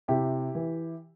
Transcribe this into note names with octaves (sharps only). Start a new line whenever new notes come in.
C3 E4 G4
E3